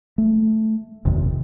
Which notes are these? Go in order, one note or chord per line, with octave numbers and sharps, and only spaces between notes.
A3
F#1 E2 C3 D#3